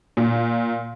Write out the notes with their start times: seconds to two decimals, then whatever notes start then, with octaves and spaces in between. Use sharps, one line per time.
0.17 A#2